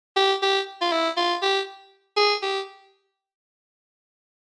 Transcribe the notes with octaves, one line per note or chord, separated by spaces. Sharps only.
G4
G4
F4
E4
F4
G4
G#4
G4